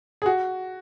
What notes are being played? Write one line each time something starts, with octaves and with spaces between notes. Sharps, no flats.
G#4
F#4